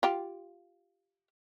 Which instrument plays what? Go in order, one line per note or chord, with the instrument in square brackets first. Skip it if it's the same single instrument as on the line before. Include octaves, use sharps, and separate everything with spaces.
[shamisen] F4 G4